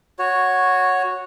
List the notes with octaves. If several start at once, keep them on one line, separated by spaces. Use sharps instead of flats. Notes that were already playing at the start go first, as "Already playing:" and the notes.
F#4 C#5